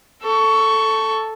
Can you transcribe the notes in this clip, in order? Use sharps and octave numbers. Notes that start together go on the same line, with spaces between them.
A4 C#6